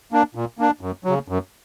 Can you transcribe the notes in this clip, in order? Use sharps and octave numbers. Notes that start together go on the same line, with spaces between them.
A#3 D4
A#2
A#3 D4
F#2
C#3 F#3
F#2